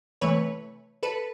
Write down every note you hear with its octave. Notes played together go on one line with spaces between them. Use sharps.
C3 E3 A3 B4 C#5
A4 B4